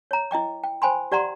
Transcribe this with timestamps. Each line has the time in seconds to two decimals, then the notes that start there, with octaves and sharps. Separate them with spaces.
0.11 C#5 A#5
0.31 E4 D#5 G5 D6
0.64 G5
0.82 C5 G5 G#5 B5 C6
1.12 G4 D5 F#5 A#5 C6